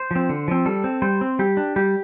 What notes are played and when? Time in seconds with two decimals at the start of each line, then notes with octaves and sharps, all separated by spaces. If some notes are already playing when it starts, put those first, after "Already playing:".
Already playing: C5
0.11 F3 C4
0.29 D3
0.48 F3 C4
0.66 G3 A4
0.84 C4
1.02 G3 C5
1.21 C4
1.39 G3 G4
1.57 D4
1.76 G3 G4